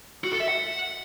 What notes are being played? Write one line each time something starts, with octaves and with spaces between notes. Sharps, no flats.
F#4
A4
E5
F#5